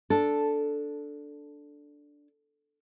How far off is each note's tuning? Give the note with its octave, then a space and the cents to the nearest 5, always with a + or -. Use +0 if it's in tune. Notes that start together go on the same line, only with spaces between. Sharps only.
D4 -5 A4 +0